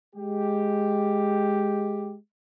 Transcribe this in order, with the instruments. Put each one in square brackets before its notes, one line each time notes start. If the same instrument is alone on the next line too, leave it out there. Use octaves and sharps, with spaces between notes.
[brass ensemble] G#3 G4